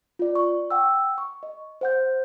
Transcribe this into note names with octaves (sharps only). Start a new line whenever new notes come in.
F4 D5
C#6
F#5 G5 E6
C#6
D#5
C5 F#5 G6